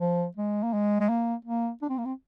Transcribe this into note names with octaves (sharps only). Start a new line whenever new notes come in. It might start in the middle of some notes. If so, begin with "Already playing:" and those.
F3
G#3
A#3
G#3
G#3
A#3
A#3
D4
C4
A#3
C4